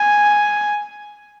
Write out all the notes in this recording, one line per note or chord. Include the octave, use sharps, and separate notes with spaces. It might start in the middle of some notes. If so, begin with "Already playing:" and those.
Already playing: G#5